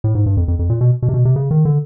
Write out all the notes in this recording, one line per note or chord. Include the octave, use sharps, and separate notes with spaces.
A2
G#2
G2
F2
F2
F2
A#2
B2
B2
C3
B2
C3
C#3
D#3
D3